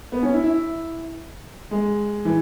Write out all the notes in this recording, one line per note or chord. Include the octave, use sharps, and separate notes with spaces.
B3
C#4
E4
E4
G#3
E3